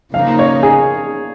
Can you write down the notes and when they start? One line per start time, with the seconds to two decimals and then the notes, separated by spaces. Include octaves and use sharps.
0.14 C#3 F3 A#3 D#4 F5
0.39 C#5
0.63 G#4